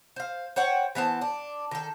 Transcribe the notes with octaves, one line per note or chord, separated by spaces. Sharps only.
C5 F5
C5 C#5 F#5 G5
E3 B3 C5 A5
D4
D#3 A4